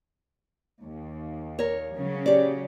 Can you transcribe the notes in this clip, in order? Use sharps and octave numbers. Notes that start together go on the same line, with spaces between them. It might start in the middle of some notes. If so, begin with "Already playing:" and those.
D#2
A#4 C#5
C#3 F#3 C#4
G4 D5